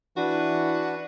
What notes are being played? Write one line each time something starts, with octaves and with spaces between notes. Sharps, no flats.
E3 D4 F#4 B4